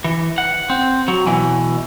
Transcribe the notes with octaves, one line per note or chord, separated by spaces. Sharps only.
E3
F#5
C4
F#3
B2 E3